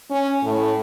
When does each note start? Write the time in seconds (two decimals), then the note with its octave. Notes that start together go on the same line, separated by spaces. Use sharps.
0.10 C#4
0.43 A2